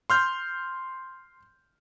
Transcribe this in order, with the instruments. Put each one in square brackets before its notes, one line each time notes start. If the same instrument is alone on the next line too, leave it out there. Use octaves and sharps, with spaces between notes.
[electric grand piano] C6 F6 G6